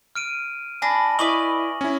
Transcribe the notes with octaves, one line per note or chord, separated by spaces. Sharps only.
F6 D7 D#7
D4 G#5 B5 A#6
E4 B4 D5 D#5 C#6 D#6 F#7
C#4 E4